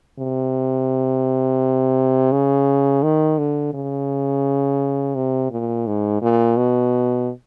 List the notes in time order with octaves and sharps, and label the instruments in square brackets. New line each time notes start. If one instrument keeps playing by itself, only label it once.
[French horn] C3
C#3
D#3
D3
C#3
C3
A#2
G#2
A#2
B2